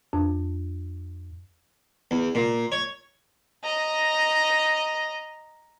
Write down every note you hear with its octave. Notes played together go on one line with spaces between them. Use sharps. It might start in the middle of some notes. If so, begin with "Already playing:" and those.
F2 D4
E2
A#2
C#5
D#5 A#5